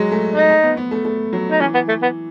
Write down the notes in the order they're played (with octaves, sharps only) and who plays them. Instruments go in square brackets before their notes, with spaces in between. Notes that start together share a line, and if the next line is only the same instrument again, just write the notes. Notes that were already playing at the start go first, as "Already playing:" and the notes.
Already playing: [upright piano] F#3 G#3
A3
[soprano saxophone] D#4
[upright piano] A3
B3
B3
A3
A3
F#3
[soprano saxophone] D#4
[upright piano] E3 [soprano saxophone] C#4
[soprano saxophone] B3
A3
B3